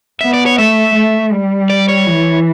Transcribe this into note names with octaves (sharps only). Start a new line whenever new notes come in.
B3 E5
D5
C#5
A3 E5
A3
G3
D5
C#5
E3